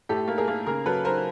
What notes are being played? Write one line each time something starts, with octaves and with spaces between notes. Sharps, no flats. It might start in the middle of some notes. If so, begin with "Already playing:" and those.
A2 G4 A4
A#3
G#4 A#4
A#3
C#3 G#4 A#4
F#3 A4 B4
F#3 A#4 C5